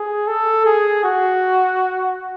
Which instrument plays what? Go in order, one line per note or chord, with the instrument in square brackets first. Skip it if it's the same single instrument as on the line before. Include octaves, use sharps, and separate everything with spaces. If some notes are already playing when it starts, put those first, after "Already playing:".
Already playing: [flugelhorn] G#4
A4
G#4
F#4